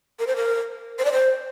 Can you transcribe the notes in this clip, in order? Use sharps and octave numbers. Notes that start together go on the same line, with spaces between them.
A#4
C5
A#4
C5
D5
C5